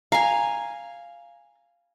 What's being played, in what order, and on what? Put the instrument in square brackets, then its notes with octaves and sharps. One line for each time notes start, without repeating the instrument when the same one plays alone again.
[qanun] F5 G#5 [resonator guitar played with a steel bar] A#5